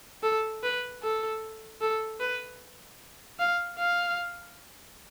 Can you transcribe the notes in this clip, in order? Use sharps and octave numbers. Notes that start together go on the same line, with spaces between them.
A4
B4
A4
A4
B4
F5
F5